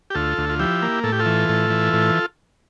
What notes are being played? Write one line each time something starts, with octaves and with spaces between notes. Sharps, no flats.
G4
D2 F4 A4
D2
F4
F3 E4 G4
A#3
A2 A4
G4
F4 A4
E3
A2
E3
A2